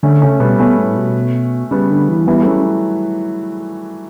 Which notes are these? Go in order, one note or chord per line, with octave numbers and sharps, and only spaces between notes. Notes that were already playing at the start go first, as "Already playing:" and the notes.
D3 A3 C#4
C#3 A3 C#4
B2 G3 B3
B2 A3 C#4
A2
B2
C#3 G3 B3
D3
E3
E3 G3 B3
F#3 A3
C#4